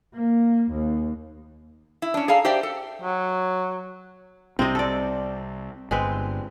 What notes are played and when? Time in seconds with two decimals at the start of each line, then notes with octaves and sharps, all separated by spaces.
0.15 A#3
0.71 D#2
2.02 E4
2.14 C#4 D4
2.28 G#4 A4 D5 F5 A#5
2.45 G4 C5 D5 E5 G5
2.63 A4
3.02 F#3
4.59 C2 C3 C4 D#5
4.75 A4 D5
5.91 G1 G#3 C4 B4